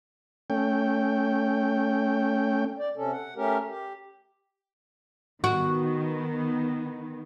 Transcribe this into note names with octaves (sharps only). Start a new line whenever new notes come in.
A3 C#4 G5
D5
C3 C#4 A4
F#5
A3 C#4 G4 A#4
G4
D#3 B3 F#4